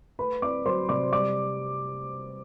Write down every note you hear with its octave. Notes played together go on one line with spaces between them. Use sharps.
A3 B4 B5
C4 D5 D6
F#3 C5 C6
C3 D5 D6
G3 D5 D6